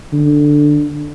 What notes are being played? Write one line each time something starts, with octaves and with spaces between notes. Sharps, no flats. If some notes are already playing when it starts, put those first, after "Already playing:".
D3